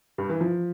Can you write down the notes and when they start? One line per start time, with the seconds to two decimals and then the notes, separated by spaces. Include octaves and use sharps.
0.18 G2 G3
0.29 E3
0.41 F3